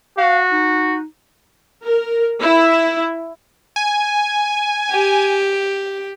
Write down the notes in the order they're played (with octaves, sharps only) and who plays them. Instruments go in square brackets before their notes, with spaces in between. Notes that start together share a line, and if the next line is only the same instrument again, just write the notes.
[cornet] F#4 [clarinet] F5
[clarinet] D#4
[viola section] A#4
E4
[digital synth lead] G#5
[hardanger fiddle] G4